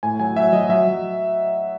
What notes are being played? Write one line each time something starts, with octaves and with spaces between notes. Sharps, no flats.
A2 G#5
F#3 G#5
F#3 E5
F#3 D#5
F#3 E5
F#3